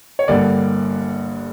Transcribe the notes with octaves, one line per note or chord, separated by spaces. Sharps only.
C#5
G1 G2 D3 A#3 D5